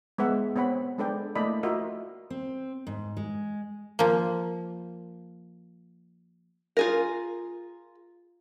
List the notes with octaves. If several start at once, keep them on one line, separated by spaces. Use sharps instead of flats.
G#3 B3 B4 E5 F#5
B3 C4 C#5 F#5 B5
G#3 D4 A4 B4 D5 G5
A3 A#3 E4 D5 D#5 B5
F4 F#4 A#4 D#5 E5
C4
G#2
G#3
F3 A#3
F4 G#4 A#4